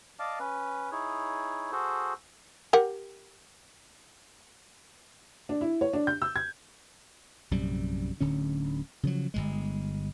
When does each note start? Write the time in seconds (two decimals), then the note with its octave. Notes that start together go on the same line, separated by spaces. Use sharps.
0.19 D5 D#5 F5 A5 D6
0.39 C#4 B4
0.92 D#4 E4 G#4 C#5
1.72 F#4 G#4 A4 C5
2.73 G4 A#4 F#5
5.49 D4
5.61 E4
5.81 C#5
5.93 D4
6.07 G6
6.22 E6
6.36 G#6
7.51 A#1 F#2 C3 G3
8.21 D1 D3 C#4
9.03 C#3 F3 F#3
9.34 G1 C#2 G#3